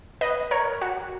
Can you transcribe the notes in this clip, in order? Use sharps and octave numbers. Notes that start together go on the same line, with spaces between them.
B4 D#5
A#4 C#5
F#4